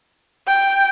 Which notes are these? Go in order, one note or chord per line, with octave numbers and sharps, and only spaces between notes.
G5